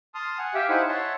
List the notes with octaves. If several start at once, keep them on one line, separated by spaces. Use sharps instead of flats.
A5 C6 D#6 F6
F#5 G#5
G4 E5 F5 G5
D#4 E4 C5 F5 F#5 G#5
C#5 E5 F#5 A5 C6